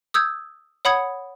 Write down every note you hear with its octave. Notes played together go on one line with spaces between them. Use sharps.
D#6 E6 G6 G#6
C#5 F#5 B5 D#6 G#6 C#7